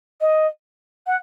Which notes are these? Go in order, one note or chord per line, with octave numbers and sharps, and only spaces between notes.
D#5
F#5